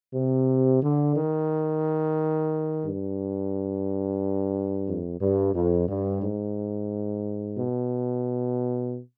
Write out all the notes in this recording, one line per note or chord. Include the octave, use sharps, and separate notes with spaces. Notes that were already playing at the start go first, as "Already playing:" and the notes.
C3
D3
D#3
G2
F2
G2
F2
G2
G#2
B2